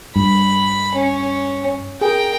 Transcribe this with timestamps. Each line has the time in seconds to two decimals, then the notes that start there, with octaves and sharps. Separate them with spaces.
0.16 G2 B5
0.95 C#4
2.01 G#4 A#4 G5